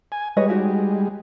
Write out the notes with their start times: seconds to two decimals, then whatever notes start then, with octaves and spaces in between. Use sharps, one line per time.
0.12 G#5
0.37 G3 G#3 B4 C#5 D#5
0.49 D#4 F#4 G4